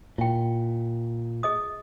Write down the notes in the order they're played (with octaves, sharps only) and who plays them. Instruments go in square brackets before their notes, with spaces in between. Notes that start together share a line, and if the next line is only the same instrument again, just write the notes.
[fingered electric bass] A#2 [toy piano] E4 G5
[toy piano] G#4 D#5 D#6